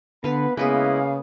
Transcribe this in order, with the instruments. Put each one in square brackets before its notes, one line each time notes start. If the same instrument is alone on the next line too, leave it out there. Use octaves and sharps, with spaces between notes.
[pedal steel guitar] D3 [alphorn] B3 [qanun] B4 F5 [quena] B5
[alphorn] C#3 [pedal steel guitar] G#3 E4 B4 [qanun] A#3 B3 G#4 [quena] F5